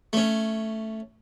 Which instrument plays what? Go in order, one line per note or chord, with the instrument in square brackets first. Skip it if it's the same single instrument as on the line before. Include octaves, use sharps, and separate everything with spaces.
[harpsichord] A3 C#4